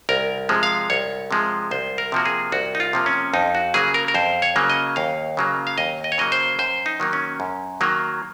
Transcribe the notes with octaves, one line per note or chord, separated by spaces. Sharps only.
C2 A#4
C3 F3 G#3
F5
C2 C#5
C3 F3 G#3
C2 C5
A#4
C3 F3 A#3 F#4
G#4
C2 F#4
D#4
F4
C3 F3 A#3
C#4
F2 D#4
F#4
C#3 F#3 A#3 G#4
A#4
A#4
F2 C5
C#5
C#3 F#3 A#3
D#5
D#2 F5
C#3 F#3 A#3
F5
D#2 D#5
D#5
C#5
C#3 F#3 A#3 D#5
C5
F#2 C5
D#4
D#3 F#3 A#3
C#4
F#2
D#3 F#3 A#3